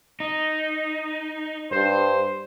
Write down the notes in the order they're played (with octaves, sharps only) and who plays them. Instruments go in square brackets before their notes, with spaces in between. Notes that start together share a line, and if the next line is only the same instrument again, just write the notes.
[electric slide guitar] D#4
[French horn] G2 [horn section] C5